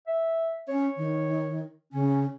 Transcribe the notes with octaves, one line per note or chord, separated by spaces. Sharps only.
E5
C#4 C#5
D#3
C#3 C#4